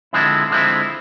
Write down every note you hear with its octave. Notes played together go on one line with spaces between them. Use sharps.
D3 F3 G#3 C4 E4
D3 F3 G#3 C4 E4